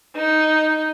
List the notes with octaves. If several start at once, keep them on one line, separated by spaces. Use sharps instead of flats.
D#4